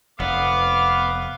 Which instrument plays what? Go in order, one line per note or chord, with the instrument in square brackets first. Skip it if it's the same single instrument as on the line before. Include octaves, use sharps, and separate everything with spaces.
[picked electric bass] F1 [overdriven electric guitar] B3 [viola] F5 [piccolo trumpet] D6